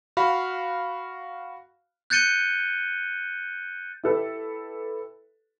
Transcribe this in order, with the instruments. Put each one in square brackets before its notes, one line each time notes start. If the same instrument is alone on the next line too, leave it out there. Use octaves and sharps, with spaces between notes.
[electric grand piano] F#4 F5 B5
[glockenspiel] F#6 G6 A6 C#7 D#7 G7
[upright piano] E4 G4 A4 B4